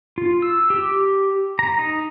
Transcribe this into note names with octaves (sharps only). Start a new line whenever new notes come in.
F4
E6
G4
A#5
D#4